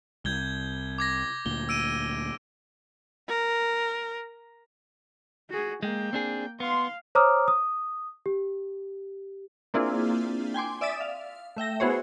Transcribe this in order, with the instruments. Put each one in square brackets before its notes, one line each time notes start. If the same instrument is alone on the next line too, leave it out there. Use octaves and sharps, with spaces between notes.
[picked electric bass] C2 [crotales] G6 G#6 G7
[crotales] D6 G#6 A#6
[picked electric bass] D2 A#2 [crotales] G7
[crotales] E6 D7 D#7
[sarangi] A#4
[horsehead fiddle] F#4 G#4
[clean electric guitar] G#3 [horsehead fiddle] A#3 G5
[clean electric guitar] C4 D4 G#4
[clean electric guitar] B3 [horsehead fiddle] F5 [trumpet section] C6
[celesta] C5 C#5 A#5 D6 D#6 F6
D#6
G4
[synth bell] A#3 C4 D4 E4 F4 G#4
G5 G#5 C6 D6
D5 E5 D#6 E6 A6 B6
F5
A3 E5 G5 A#6
B3 E4 F#4 G#4 C5 C#5